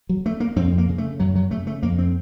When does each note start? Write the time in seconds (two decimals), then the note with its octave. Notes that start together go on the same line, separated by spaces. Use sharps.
0.09 F#3
0.26 A3
0.40 A#3
0.56 F2 C4
0.78 A#3
0.88 C#3
0.98 A3
1.20 F#2 F#3
1.36 F#3
1.51 C#3 A3
1.67 A3
1.82 F2 A#3
1.99 C4